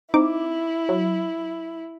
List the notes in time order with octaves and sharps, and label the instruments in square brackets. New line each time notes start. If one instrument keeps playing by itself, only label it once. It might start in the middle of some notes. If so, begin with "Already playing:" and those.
[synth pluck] C4 D#4 D6 [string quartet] E4
[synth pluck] F#3